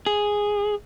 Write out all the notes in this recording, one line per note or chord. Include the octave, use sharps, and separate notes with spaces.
G#4